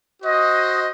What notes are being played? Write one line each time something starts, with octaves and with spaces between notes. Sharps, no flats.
F#4 C5 D#5